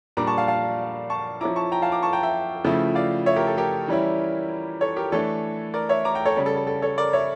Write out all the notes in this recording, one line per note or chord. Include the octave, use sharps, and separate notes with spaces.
A#2 G3 D4 A#5 D6
A5 C#6
F5 A5
F5 A5
A5 C#6
F3 C#4 E4 A#5 D6
A5 C#6
G5 A#5
F5 A5
A#5 D6
A5 C#6
G5 A#5
E5 G5
C#3 F3 A3 E4
D5 F5
C#5 E5
G4 A#4
A4
G4 A#4
E3 G3 C#4 E4
A4 C#5
G4 A#4
E3 A3 D4 A4 C#5
A#4 D5
C#5 E5
A#5 D6
G5 A#5
A4 C#5
C#3 G3 C#4
A4
A4
A4
A4 C#5
A#4 D5
C#5 E5